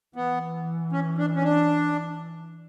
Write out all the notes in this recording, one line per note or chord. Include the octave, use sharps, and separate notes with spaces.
E3 B3
C#4
D4
C#4
D4